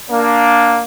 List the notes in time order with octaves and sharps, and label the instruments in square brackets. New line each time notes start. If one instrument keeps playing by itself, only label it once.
[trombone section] A#3 D4